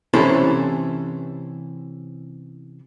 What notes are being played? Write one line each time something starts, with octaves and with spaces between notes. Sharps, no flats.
C3 E3 C#4 E4 A4 C5